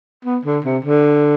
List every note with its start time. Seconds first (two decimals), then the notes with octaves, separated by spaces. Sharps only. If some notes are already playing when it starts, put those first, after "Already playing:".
0.25 B3
0.45 D3
0.64 C3
0.85 D3